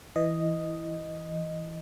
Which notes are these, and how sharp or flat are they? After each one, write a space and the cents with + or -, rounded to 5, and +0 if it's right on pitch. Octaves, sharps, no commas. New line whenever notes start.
E3 +0 D#5 +0